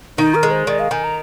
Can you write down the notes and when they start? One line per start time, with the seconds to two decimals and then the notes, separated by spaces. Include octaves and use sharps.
0.18 D#3 D#4
0.35 A#4
0.43 G#3
0.51 C5
0.67 D#3 D5
0.79 F5
0.91 D#3 G#5
1.04 A#5